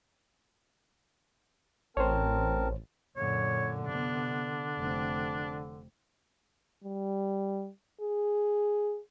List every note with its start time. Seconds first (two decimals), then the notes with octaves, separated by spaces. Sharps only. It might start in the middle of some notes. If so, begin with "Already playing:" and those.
1.97 A1 C4 A#4 C5 C#5 A5
3.16 F#2 A#2 D3 C#5
3.86 C3 B3 D4
4.77 F1 C4
6.84 G3
8.01 G#4